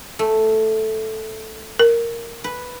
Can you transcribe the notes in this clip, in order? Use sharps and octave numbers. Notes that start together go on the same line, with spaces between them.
A3
A#4
B4